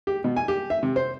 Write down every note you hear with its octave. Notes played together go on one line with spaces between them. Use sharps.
G4
B2
G#5
G4
E5
C3
C5